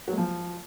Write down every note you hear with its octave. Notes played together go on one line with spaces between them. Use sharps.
F#3
G#3
F3